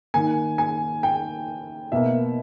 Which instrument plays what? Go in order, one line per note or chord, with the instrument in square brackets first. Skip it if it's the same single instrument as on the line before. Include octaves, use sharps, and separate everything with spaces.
[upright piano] D#3 A#3 G#5
G#5
G5
B2 A#3 E5